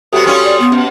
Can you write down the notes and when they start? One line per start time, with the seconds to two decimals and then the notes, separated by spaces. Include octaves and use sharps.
0.13 C3 F#3 B3 F#4 G4 A4 D#6
0.26 G3 C#4 F4
0.44 D5
0.60 B3
0.72 B2 C#4